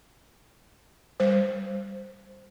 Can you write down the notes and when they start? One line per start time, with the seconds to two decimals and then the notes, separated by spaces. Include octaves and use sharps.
1.20 G3 C5